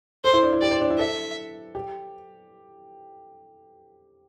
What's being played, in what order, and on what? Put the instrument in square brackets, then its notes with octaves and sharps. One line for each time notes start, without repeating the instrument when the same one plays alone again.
[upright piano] A4 [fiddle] C5
[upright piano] E4
D4
E4
[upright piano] G4 [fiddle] D5
[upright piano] C5
D4
E4
[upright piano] A4 [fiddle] E5
[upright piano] G4